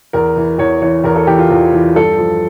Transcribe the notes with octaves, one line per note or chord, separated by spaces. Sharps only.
E2 A#4
E3
E2 C#5
E3 C#5
E2 A#4
A4
E3 G4
F4
E2 F4
E3
G2 A4
F3